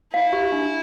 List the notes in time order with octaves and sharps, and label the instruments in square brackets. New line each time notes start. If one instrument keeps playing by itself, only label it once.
[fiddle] E4 [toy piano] F5
[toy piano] G4
D4